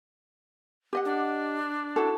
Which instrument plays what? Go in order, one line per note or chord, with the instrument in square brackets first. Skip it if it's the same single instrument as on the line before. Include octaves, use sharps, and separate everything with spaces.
[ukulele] G4 D#5 F#5
[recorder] D4
[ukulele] E4 F#4 A4